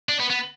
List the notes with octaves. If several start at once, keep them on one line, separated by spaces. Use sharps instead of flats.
D4
B3
B3